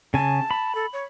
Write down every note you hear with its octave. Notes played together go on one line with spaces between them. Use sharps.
C#3 G#5 A5
B5
A4
C#5